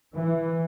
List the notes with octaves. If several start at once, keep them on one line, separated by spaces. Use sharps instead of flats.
E3